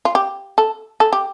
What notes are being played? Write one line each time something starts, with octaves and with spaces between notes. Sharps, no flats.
F4
G4
A4
A4
G4